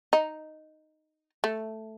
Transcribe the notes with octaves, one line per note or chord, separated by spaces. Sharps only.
D#4
A3